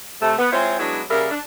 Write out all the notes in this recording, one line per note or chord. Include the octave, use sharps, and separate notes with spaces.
C3 A3
B3
G#3 C4 E4 F4 C5 C#5
F#3 G#3 B3 C#4 D4 E4
C#3 G3 A#3 G#4 A#4 E5
D4